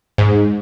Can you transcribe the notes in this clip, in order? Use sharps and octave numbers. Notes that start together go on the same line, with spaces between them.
G#2